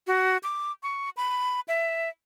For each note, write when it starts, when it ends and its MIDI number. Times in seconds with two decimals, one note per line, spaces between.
0.07 0.37 66
0.43 0.72 86
0.83 1.10 85
1.17 1.60 83
1.68 2.09 76